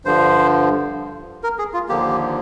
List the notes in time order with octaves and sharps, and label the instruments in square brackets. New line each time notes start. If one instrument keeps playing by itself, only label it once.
[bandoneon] G2 D3 F3 C5
A#4
G#4
F4
D#2 D3 F3 A#3 G4